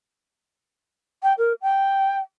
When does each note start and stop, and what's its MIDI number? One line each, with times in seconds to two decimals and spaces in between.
1.23 1.33 79
1.38 1.53 70
1.62 2.18 79